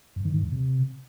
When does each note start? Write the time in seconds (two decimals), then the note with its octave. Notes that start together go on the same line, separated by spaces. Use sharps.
0.16 F#2
0.25 D#3
0.34 G#2
0.43 E2
0.52 C3